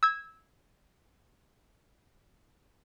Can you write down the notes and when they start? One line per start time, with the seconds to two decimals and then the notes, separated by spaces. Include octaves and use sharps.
0.03 E6 G#6